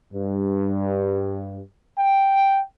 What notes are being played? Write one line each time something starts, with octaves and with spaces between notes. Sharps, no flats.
G2
G5